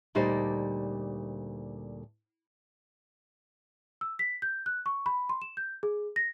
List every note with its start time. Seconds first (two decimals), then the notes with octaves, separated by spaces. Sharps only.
0.15 D2 A#2 G3 D#4 C5 D5
4.01 E6
4.19 B6
4.42 G6
4.66 F#6
4.86 C#6
5.06 B5
5.29 C6
5.42 E7
5.57 G6
5.83 G#4
6.16 A#6